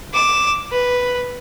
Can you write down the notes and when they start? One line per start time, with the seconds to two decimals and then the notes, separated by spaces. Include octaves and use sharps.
0.13 D6 E7
0.71 B4